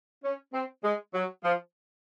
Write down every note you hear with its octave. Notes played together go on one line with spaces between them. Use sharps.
C#4
C4
G#3
F#3
F3